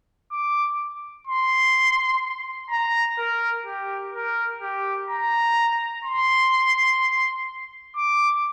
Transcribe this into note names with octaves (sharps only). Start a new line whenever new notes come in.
D6
C6
A#5
A#4
G4
A#4
G4
A#5
C6
D6